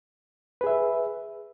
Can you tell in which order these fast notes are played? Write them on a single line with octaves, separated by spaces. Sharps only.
B4 G#4 E5